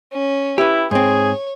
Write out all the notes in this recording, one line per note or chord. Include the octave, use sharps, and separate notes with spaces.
C#4
E4 G4 B4
G#2 C4 G#4 C#5